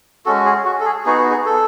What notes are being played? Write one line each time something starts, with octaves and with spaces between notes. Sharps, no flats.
G#3 C#4 F#4 A4
G#4
F#4
A4
G#4
B3 D#4 F#4 G#4
F#4
G#4
A4